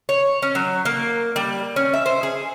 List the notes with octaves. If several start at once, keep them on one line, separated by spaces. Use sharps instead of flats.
C#5
C#4
F#3
A#3
G3
C#4
E5
C5
G#4